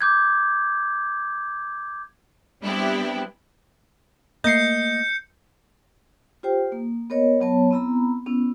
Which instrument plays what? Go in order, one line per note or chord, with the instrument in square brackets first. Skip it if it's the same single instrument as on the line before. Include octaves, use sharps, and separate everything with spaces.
[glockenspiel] D6 G6 G#6
[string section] G3 B3 C4 D4 E4 G4
[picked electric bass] A3 A#3 [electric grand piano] D#5 C7 [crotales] G6 C#7
[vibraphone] F4 G4 C5 G5
A#3
B3 A#4 C#5 D#5
F#3 B3 C#5 A5
B3 C4 E4 A#5 B5
B3 C#4 E4